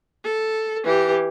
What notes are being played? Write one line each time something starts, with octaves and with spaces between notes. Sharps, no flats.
A4
E3 G4